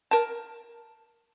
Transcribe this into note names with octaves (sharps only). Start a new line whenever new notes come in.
A#4 A5